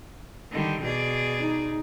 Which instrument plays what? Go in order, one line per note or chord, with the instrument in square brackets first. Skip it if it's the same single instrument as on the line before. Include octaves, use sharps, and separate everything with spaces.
[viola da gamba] D3 D#3 G3
B2 G#4 D5
[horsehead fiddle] D#4